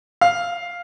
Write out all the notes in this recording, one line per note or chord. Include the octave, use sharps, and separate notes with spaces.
F5